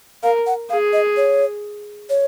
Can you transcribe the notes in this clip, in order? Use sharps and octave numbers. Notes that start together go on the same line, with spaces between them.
A#4 F5
F#5
G#4 F5
D#5
C#5
C#5